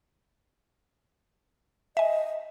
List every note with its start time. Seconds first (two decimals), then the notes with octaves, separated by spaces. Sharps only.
1.97 D#5 E5 G#5